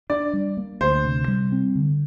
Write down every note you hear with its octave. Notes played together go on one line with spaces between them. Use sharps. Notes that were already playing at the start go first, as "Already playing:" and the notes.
D4 D5
G3
A#3
D2 C5
C3
G3
C4
D3